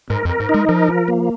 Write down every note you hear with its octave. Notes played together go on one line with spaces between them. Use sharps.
G#2 A#4
F2
A#4
G#2
D#4
G#3
F3 A#4
F3
A#3